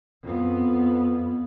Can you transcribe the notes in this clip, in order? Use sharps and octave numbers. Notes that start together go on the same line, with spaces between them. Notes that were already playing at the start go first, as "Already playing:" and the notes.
F2 B3